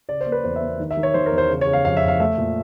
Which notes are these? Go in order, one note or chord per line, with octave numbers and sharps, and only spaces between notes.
C#3 D5
C5
A#3
B4
E2 C5
E5
A#3
D#3
E5
D#3
C#5
D#3 C5
A#4
E2
C5
C#3
C#5
C#3
F5
F2 F5
E5
F2
F5
A3 E5
A#2